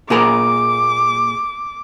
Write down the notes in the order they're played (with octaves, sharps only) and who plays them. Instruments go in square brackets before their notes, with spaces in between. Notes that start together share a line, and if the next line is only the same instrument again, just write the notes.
[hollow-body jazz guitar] A#2 G#4 A#4 [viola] D6